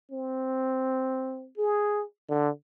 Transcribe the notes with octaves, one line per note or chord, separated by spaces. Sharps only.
C4
G#4
D3